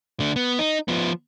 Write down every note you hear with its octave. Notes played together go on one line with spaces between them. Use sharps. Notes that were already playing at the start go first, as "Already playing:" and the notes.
D3 A3
B3
D#4
F3 B3